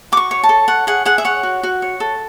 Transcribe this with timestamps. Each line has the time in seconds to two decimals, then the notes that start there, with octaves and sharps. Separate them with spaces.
0.12 F#4 D6
0.17 C#6
0.31 C#5
0.43 A5
0.49 A4
0.68 C#5 F#5
0.87 G#4 F#5
1.05 G#4 F#5
1.18 E5
1.25 C#5 F#5
1.43 F#4
1.63 F#4
1.82 C#5
2.00 A4